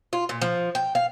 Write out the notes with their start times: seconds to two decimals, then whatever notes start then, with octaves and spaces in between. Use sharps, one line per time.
0.13 F4
0.29 A#2
0.42 F3
0.75 G5
0.95 F5